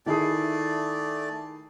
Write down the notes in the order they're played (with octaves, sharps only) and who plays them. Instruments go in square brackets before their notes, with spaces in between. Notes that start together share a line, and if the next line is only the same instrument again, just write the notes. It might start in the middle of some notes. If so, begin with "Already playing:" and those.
[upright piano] D#3 E4 G#4 [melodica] A3 D5